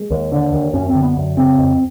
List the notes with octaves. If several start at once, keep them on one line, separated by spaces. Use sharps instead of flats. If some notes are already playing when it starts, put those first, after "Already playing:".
Already playing: G#3
D#2
D3
D#2
F#2 C#4
C4
D3
B3
F#2
C#3 C4
F2